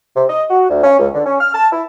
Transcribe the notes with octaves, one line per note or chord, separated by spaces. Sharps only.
C3
D#5
F#4
D2
C#4
C#2
D3
C#4
F6
A5
E4